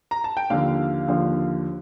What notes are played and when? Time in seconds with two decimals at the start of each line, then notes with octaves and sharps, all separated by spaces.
0.11 A#5
0.24 A5
0.37 G5
0.50 D#2 D3 F3 F5
1.08 D#2 D3 F3